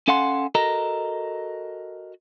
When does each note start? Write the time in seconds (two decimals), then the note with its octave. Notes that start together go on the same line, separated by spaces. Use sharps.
0.08 C#4 A4 F5 F#5 G#5 C6
0.55 F#4 A4 A#4 D#5 A#5